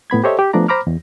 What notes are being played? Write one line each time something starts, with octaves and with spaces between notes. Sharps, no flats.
A2 B3 B5 G#6
G4 A4 C5 C#5 D#5 E5
G4
F3 A3 B3 D4 D5 A#5
C5 A#5 B5 D6 F6
E2